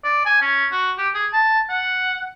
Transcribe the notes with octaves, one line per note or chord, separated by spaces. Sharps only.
D5
G#5
C#4
F#4
G4
G#4
A5
F#5